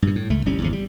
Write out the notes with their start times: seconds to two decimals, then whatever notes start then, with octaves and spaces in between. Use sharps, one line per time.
0.02 G2 A#2
0.16 A2
0.30 C#2 A3
0.46 G1 C2 G3 C#4
0.60 G#1 E2 C3
0.73 G3